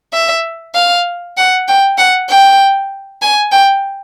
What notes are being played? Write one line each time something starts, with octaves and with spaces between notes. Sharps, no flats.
E5
F5
F#5
G5
F#5
G5
G#5
G5